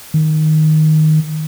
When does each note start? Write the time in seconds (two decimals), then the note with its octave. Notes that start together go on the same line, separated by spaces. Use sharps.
0.14 D#3